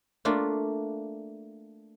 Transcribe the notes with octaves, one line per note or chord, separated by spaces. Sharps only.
A3 A#3 D4 F4